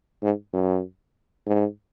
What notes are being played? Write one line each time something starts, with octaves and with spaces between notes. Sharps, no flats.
G#2
F#2
G#2